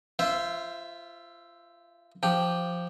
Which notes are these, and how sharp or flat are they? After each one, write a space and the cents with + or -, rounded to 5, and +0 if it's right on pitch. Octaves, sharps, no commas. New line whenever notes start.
F4 -25 C5 +0 E5 +0
F3 +0 G4 -5